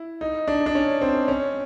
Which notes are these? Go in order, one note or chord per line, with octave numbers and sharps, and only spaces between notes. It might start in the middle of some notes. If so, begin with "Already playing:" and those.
Already playing: E4
D#4
D4
D4
C#4
C4
C#4